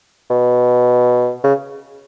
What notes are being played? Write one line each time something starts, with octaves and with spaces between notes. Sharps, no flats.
B2
C#3